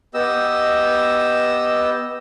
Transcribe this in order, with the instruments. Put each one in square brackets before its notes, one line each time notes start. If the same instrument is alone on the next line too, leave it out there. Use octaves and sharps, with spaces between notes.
[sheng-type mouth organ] B3 G4 D#5 E6